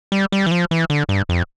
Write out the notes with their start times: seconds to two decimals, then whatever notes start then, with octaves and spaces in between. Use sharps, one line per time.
0.12 G3
0.32 G3
0.46 E3
0.51 F3
0.71 E3
0.90 D3
1.09 G2
1.29 F2